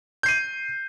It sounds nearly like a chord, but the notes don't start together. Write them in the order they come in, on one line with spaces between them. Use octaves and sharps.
G6 C7 D#7